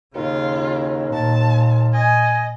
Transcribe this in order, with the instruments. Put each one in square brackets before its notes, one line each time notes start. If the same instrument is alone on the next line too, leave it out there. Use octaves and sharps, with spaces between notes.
[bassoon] D#2 [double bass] C#3 [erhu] F4
[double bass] A#2 [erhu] A5
[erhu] D#5 [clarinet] G#5